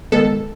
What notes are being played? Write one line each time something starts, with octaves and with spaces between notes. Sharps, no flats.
D#3 G#3 B3 A4